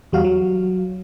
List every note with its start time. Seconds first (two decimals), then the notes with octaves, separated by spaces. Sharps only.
0.12 E2 G3 F#4 F5
0.24 F#3